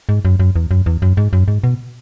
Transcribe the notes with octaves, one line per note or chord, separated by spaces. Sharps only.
G#2
F#2
F#2
E2
F#2
E2
F#2
G#2
F#2
G#2
B2